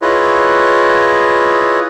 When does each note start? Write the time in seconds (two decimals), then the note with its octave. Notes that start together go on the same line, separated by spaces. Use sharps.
0.02 E4 F4 G#4 B4 C#5 D#5